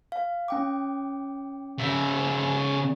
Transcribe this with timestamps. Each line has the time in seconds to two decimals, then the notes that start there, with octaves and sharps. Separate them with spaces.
0.12 F5
0.48 C#4 G5 D6
1.78 C#3 E5